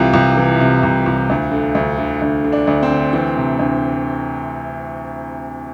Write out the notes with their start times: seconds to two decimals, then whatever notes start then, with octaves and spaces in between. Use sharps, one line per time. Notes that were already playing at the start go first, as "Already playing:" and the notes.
Already playing: C2 C3 E3 F4
0.14 C2
0.37 E3
0.60 C3
0.83 C2
1.06 C2
1.30 D2
1.51 D3
1.75 D2
1.98 D3
2.22 D2
2.44 D3
2.52 D4
2.67 D2
2.83 C4
2.91 D3
3.13 E3 C4
3.37 C3
3.59 D2